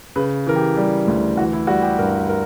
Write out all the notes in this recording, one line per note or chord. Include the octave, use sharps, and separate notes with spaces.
C#3 B4
E3 A#4
G4
G3
D2
E3 F#4
E4
G3 F#4
G4
G2 A#4
A#4